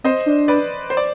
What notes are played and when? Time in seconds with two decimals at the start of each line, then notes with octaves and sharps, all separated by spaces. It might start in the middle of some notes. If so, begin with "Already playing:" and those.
0.04 C4 C5 D#5
0.26 D4
0.48 B4 D5
0.90 C5
0.97 D5